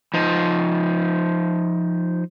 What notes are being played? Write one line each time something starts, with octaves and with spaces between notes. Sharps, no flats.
F3 D#4